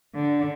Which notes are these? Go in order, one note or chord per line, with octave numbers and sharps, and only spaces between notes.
D3